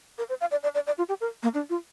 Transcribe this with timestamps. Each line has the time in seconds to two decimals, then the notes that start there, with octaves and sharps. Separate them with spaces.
0.18 A#4
0.29 C5
0.41 F5
0.51 D5
0.63 D5
0.75 D5
0.87 D5
0.98 F4
1.09 G4
1.21 A#4
1.43 A#3
1.54 D4
1.70 F4